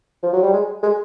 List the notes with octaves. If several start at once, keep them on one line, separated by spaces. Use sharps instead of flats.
F3
F#3
G3
G#3
G#3